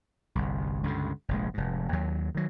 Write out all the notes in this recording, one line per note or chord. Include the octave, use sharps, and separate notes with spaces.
G1 C2
C#2 G2 D3
F1 A#1 G#3
F1 G#2
D#2 F#3
D#3 F#3